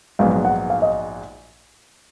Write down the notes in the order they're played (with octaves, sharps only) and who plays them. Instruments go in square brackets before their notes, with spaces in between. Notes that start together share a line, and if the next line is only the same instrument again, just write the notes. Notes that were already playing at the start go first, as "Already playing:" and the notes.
[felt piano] A#1 G#2 F#3 B3 [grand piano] F5
[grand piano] F#5
F5
D#5